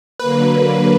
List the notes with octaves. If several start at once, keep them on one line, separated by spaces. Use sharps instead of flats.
D3 F#3 A#3 B4